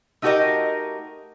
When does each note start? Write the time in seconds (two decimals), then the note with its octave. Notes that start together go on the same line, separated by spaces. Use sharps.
0.22 A3 D#4 F#4 G4 A#4 D#5